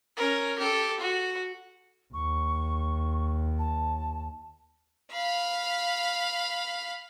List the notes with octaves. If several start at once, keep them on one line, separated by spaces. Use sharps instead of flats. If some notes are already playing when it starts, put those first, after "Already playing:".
C#4 A#4
G4 A4
F#4
D#2 C#6
A5
F5 B5